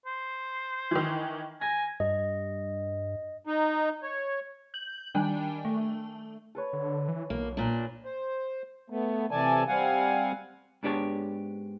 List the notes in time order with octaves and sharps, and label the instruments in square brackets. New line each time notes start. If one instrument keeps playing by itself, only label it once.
[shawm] C5
[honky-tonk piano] D#3 E3
[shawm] G#5 [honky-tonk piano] A#6
[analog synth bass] G2 [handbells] D#5
[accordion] D#4
C#5
[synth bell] G6 F#7
D#3 G3 D4 G5 G#5
A3
[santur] A4 B4 C#5
[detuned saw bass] D3
E3
[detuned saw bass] B1 [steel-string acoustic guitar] A#3
[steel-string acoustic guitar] A#2 D4
[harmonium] C5
A3 B3
C3 E3 A4 D5 G#5 A5
G3 C4 F5 F#5 G#5
[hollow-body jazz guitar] G#2 B3 D4 G4 C#5 A5